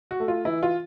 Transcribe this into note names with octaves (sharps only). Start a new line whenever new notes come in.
F#4
A3
F4
E3 E4
F4